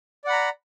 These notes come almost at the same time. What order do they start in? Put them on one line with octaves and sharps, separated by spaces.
D5 F#5 B5 A#5